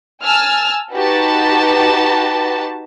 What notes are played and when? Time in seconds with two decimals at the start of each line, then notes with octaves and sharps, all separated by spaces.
0.23 G#5 A5 E6 F6
0.93 D#4 F#4 G4 B4 A5